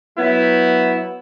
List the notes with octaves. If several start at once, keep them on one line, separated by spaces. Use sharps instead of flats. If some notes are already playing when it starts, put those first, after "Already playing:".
F#3 B3 E4